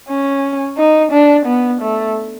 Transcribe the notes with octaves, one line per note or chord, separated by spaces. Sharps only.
C#4
D#4
D4
B3
A3